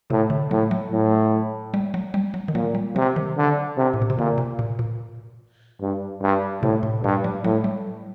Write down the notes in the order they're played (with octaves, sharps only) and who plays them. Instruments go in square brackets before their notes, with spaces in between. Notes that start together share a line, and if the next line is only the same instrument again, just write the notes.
[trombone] A2 [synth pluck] C3
[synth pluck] D3
[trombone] A2 [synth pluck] F#3
[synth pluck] F#3
[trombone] A2
[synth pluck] G3
F#3
G3
F#3
D#3
[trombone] A#2 [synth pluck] F#3
[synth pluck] G3
[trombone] C3 [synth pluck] F#3
[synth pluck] D#3
[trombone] D3
C3
[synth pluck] A2
A#2
C3
[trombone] A#2 [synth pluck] D3
[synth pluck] C3
A#2
A#2
[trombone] G2
G2
[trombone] A2 [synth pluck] C3
[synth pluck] A2
[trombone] G2 [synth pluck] A#2
[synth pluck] F#3
[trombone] A2 [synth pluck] F#3
[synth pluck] G3